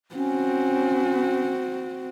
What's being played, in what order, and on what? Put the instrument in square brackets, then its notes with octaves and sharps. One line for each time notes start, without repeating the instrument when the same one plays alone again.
[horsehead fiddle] C4 F#4 [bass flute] C#4